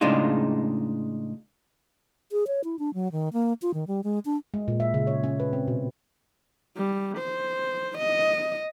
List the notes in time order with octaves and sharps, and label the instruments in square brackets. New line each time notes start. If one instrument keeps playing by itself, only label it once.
[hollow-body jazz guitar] A2 C#3 G#3 D4 D#4 F4
[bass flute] G#4
C#5
E4
D4
F#3
D#3
A#3
F4
D#3
G3
G#3
D4
[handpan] G#3
A#2
E5
C#3
C#5
C#4
B4
C4
B2
[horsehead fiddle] G3
C5
D#5